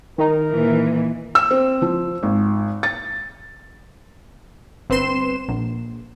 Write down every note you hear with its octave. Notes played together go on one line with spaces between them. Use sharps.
D#3 D#4 A#4
A#2 E3
E6
C4
F3
G#1
A6
G1 C4 B4 C6 E7
A#1